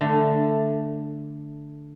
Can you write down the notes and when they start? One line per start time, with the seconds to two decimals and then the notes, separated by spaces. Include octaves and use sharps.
0.01 D3 A3